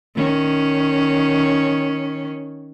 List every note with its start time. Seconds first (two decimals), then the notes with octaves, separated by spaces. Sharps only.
0.16 D#3 C#4